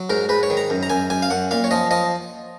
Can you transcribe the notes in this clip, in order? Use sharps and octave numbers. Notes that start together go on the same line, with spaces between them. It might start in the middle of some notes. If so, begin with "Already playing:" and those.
Already playing: F#3
G#2 A#4
G#2 B4
C#5
D#3
A#5
F#2
A#5
F#2 G#5
F#2 G#5
F5
F#2 F#5
A#2 F5
C#5
F3 D#5
F3 D#5